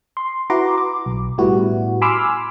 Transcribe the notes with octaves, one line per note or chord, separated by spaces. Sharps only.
C6
E4 F#4 B4 A#5 C6 D6
D6
B1
A2 G3 B3 E4 F#4
G#5 B5 C6 D6 E6 F6